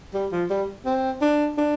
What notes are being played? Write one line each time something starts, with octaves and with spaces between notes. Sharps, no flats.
G3
F3
G3
C4
D4
D4